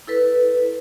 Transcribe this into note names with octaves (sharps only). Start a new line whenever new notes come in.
E4 A4 B4